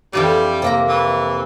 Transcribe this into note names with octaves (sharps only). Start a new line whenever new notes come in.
F2 E3 G3 D5
C3 A#3 A#5
E3